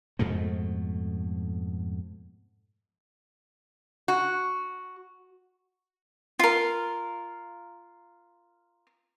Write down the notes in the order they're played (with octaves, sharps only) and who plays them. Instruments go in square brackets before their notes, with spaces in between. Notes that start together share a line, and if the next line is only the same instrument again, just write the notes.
[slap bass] F2 G#2 B2 A3
[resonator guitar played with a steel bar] F#4
[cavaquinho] F4 A#4